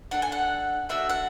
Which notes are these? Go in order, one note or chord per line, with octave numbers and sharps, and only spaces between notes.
D4 A4 F#5
G#5
F#5
A3 D4 F#4 E5
F#5